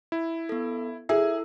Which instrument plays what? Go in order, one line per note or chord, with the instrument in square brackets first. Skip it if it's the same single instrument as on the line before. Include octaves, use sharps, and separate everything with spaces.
[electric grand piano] E4
[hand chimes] B3 A4
[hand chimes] E4 A4 E6 [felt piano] G#4 [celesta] E5